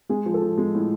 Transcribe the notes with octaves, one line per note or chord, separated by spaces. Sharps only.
G#3 G#4
F3
A4
F3
G#3
A2